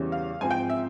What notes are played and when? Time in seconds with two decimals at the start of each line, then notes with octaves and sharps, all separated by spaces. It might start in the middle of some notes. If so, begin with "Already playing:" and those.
Already playing: E2 C#3 E3 G3 C#4
0.12 F5
0.41 G#2 F3 C4 G#5
0.51 G5
0.70 E5